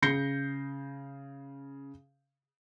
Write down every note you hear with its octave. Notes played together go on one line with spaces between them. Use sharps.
C#3 G6 A#6 C7 C#7 G7